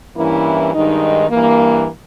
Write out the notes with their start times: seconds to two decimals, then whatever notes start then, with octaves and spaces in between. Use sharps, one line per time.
0.17 G2 E3 A#3 C#4 E4
0.74 G2 D#3 G#3 D#4
1.30 G2 E3 A#3